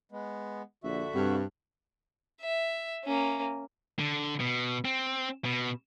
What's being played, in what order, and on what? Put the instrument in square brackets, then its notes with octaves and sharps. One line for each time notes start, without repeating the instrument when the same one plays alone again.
[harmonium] G#3 B3
[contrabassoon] A#1 [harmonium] D3 F#4 E5
[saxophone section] G2 [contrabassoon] C3
[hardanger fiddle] E5
A#3 C#4
[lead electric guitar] D3
B2
C4
B2